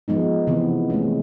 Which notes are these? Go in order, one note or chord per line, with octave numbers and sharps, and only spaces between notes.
F3 G#3 B3 D#4
C3 E3 B3 C4
G#3 A3 C#4